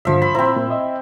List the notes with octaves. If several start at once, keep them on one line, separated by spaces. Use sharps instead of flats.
C2 G2 D3 F3 E5
B5
A#2 C4 E4 C5 A#5
A#2
D#5 E5